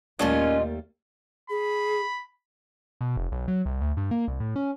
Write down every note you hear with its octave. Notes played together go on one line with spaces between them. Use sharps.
D#2 A#2 G3 A3 A#3 C#4 F4 D#5
G#4 B5
B2
F1
B1
F#3
C2
D2
G2
A#3
C2
A2
C#4